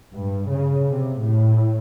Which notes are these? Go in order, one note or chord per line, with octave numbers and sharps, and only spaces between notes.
G2
C#3
C3
A2